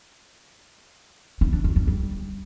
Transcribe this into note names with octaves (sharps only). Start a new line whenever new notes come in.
D#4
D4
F4
D4
G3